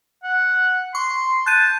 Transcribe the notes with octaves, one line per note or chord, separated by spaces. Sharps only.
F#5
C6 C#6
A5 F#6 G6 D#7